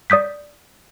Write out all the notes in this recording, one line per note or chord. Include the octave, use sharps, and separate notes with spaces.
D5 D#6 G6 B6